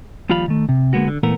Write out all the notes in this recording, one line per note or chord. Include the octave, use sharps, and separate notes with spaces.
D#2 F3 G3 F4 F5 B5
D#3 A3
C3
D3 G#3 A#3 B3 F#4
D3
A#2 E3 A3 B3 A#4